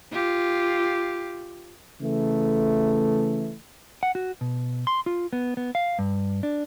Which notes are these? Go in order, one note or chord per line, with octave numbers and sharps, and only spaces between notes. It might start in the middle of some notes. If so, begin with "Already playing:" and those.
F4 G4
C#3 E3 A3
F#5
F#4
B2
C6
F4
B3
B3
F5
G2
D4